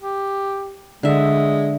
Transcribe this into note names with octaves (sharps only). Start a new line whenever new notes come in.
G4
D3 G#3 E5